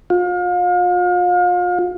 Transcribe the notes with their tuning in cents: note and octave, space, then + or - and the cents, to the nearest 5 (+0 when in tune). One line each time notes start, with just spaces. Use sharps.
F4 +35